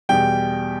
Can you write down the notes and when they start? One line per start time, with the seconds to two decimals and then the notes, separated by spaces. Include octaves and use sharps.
0.09 E2 B2 G3 G5